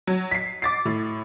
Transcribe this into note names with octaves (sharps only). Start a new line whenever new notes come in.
F#3
B6 C7
D6 A6 C7
A2